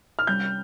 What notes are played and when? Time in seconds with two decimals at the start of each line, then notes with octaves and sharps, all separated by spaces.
0.19 F6
0.27 C3 G3 C#4 E4 G6